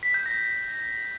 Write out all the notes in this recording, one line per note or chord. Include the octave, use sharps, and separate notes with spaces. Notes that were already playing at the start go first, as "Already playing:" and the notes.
B6
G6
A#6